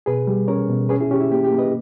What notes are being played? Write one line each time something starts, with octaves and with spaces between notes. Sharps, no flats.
B2 G#4 B4
G3
C#4 A#4 C#5
B2
C#4 G#4 B4
E4 G#4
C#4 G4
E4
A#3 G4
G4
A#3
B4 D#5